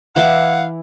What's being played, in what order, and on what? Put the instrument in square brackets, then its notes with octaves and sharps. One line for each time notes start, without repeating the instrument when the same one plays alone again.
[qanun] E3 E4 D6 [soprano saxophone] F5 [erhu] F#5